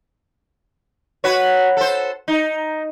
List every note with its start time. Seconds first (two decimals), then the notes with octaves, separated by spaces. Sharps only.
1.24 F#4 B4 C#5
1.77 A4 C5
2.28 D#4